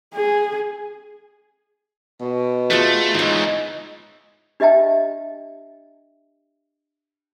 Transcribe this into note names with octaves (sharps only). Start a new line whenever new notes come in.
G#4
B2
A3 F4 G#4 B4
G#2 E3 D#4 C#5
D4 G4 D#5 E5 G5 A5